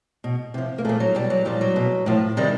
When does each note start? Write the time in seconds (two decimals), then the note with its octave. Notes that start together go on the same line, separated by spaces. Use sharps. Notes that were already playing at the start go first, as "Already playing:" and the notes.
0.24 B2
0.54 C3 F3
0.78 A#3
0.85 A#2 F3 A3
1.00 F#3
1.15 B2 G3
1.30 F#3
1.45 A#2 F3 G3
1.61 F#3
1.76 B2
2.06 A2 F3
2.37 C3 D#3 G3